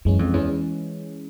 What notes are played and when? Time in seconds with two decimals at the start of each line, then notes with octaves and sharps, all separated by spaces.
0.05 F#2 E3 G#3 C#4
0.19 F2
0.33 E2 E3 G#3 C#4